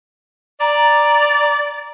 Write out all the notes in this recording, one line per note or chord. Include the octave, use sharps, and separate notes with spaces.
D5 A#5